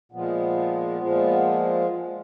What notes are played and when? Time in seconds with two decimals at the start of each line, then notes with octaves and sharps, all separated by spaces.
0.12 A#2 F3 G#3 B3
1.00 A#2 F3 G#3